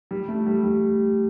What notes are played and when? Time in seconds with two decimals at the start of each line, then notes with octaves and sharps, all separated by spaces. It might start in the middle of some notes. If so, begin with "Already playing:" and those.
0.11 G3
0.28 A3
0.47 G3
0.64 G3